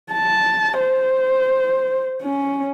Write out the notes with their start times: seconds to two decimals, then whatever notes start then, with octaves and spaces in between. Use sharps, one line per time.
0.13 A5
0.80 C5
2.23 C#4